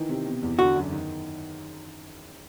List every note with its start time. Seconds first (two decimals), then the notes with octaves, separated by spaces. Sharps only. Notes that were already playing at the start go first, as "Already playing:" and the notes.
Already playing: D#3 E3
0.09 C3
0.26 B2
0.43 E2
0.59 D3 F#4
0.76 F#2
0.92 D#3